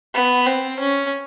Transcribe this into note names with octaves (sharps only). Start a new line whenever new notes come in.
B3
C4
C#4